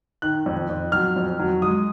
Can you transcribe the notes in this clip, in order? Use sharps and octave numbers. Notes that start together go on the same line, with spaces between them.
D#3 F#6
F2
F2
F#3 F6
F2
F#3
G#3 D#6